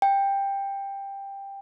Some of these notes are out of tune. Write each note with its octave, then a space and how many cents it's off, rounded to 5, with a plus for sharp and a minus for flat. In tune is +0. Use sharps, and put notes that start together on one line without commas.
G5 +15